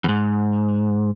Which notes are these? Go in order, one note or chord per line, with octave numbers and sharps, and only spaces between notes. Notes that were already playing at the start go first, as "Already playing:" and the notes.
E2 G#2